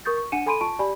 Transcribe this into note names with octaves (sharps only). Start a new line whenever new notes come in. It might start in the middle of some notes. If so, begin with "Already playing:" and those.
A#4 C#6 D#6 G6 A6
C#6
D4 F#5 G#5 C#7 D#7 E7
A4 G#5 B5 C6 D7 D#7
F4 A5 C#6 D7
G4 D5 G#5 B5